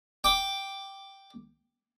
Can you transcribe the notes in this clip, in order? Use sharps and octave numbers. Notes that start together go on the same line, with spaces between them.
G5 D6